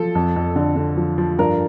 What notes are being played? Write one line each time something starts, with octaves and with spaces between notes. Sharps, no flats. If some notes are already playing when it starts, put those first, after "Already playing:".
Already playing: F3 A4
F2
F2
D3
D3
F3
F3
G2 A#4